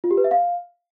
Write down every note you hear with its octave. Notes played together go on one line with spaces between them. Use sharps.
F4
G4
B4
E5
F5